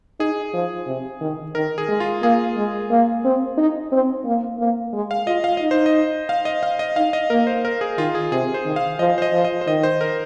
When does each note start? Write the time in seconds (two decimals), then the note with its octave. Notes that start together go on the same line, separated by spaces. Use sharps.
0.20 D#4 G#4
0.54 F3
0.87 C3
1.21 D#3
1.55 D#3 A#4
1.78 G#4
1.88 G#3
2.00 F4
2.23 A#3 G#4
2.57 G#3
2.91 A#3
3.25 C4
3.58 D#4
3.92 C4
4.25 A#3
4.59 A#3
4.93 G#3
5.11 F5
5.27 F4 D#5
5.44 F5
5.57 D#4 D#5
5.71 C5
5.86 D#5
6.29 F5
6.45 D#5
6.63 F5
6.79 D#5
6.96 D#4 F5
7.13 D#5
7.30 A#3 A#4
7.47 C5
7.65 A#4
7.81 G#4
7.98 D#3 F4
8.15 G#4
8.32 C3 G#4
8.54 C5
8.65 D#3
8.76 F5
8.99 F3 D#5
9.18 C5
9.22 D#5
9.33 F3
9.45 D#5
9.61 C5
9.67 D#3 D#5
9.83 C5
10.01 A#4